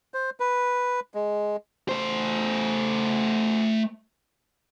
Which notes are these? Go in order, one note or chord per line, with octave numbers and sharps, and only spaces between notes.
C5
B4
G#3
A3 C5